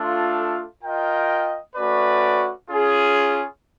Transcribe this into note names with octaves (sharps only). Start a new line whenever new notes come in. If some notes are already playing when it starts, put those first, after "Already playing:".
Already playing: A3 D4 F4 A4
F4 A#4 D#5 G5
A3 C#4 F#4 B4 D5
C#4 F4 G#4